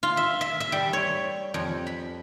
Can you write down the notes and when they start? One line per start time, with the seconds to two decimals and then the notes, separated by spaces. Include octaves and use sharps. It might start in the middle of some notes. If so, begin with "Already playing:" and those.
0.03 F4
0.17 E5
0.41 E5
0.60 E5
0.72 G3
0.93 C#5
1.54 F2
1.87 B5